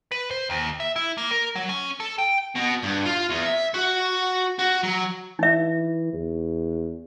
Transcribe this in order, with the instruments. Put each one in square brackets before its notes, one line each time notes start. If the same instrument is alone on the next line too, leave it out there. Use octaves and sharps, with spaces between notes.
[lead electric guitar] B4
C5
D#2
E5
E4
A#3
A#4
F#3
C#4
A4
G5
[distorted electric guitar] B2
G2
F4
E2
E5
F#4
F#4
F#3
[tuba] E3 [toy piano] D#4 E5
[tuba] E2